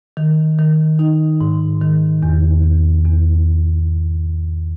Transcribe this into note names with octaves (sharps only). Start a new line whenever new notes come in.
D#3
D#3
D#4
G#2
D#3
E2
E2
E2